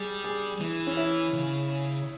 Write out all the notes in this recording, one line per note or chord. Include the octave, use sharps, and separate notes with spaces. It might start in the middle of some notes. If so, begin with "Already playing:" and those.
Already playing: G3 G#4
G#4
E3
C#4
E4
C#3